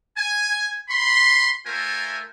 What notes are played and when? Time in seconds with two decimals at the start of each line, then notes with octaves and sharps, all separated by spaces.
0.17 G#5
0.89 B5 C6
1.66 A3 F4 A#4 C5 E5 G#5